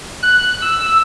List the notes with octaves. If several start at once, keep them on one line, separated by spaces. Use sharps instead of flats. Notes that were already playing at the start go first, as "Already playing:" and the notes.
F#6
E6